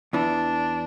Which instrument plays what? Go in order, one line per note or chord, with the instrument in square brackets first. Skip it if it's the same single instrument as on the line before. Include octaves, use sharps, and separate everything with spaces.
[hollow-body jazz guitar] E2 E3 [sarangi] D4